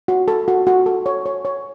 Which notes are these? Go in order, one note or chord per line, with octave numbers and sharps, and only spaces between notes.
F#4
A4
F#4
F#4
A4
C#5
C#5
C#5